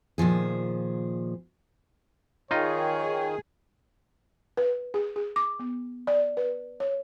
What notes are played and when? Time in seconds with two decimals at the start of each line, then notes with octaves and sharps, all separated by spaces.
0.18 A#2 D#3 F3 G#4
2.51 D#3 D#4 F4 G#4 C#5 D#5
4.57 B4
4.94 G#4
5.16 G#4
5.36 D6
5.59 B3
6.07 D5
6.37 B4
6.80 C#5